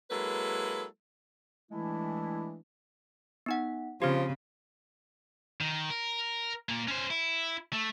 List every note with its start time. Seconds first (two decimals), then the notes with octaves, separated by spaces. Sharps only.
0.11 F#3 G#3 A#3 E4 A4 B4
1.72 E3 G#3 A3 D4 E4
3.46 B3 D#4 F#5
4.02 C#3 F3 C4 G4
5.61 D#3
5.90 A#4
6.69 A#2 A#3
6.88 C#4 C5
7.10 E4
7.73 A3